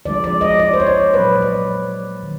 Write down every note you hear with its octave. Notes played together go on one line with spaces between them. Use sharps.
D3 F3 G#3 D5
D5
D#5
D5
C5
C#5
D5
A#2 F#3 A#3 B4
D5
D#3